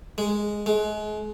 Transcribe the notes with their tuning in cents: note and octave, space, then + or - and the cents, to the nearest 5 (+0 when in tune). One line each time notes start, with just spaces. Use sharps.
G#3 +0
G#3 +35